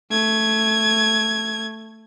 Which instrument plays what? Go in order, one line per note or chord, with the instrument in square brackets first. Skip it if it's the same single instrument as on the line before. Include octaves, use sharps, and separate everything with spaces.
[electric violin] A3 G#6